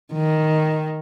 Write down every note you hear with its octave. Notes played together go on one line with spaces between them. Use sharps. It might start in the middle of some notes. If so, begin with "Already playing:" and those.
D#3